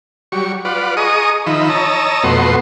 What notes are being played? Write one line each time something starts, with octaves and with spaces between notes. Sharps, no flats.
F#3 G3 C#6
F4 B4 D5 F#5
G#4 D#5 A#5 C#6 D#6
D#3 F3 D#4 E5 B5
C#5 D#5 A5 A#5 E6
F2 B2 A3 B3 F#4 C6